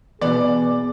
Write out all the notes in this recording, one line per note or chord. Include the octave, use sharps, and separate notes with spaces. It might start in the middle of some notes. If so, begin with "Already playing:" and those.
B2 E3 B3 G#4 D5